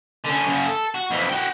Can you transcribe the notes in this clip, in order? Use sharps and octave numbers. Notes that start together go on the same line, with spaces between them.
D3 C#4
F#2 C#3
A4
F#4
F2 E3
F#4 G5